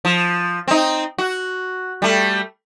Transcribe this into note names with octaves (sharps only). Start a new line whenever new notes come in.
F3
C4 D#4
F#4
G3 A3